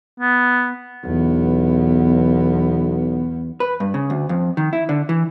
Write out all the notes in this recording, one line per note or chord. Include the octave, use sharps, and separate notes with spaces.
B3
B1 E2 B3
B4
G2
C#3
D2
F2
D#3
E4
D3
E3